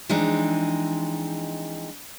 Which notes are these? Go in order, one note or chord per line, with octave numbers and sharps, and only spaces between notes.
E3 F3 G#3 C4 D4 D#4